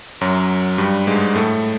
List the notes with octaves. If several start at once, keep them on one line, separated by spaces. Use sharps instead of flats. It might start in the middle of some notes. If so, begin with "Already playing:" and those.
F#2 F#3
G2 G3
G#2 G#3
A2 A3